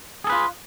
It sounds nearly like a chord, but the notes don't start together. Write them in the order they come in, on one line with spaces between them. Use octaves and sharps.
G#4 A4 B4 F4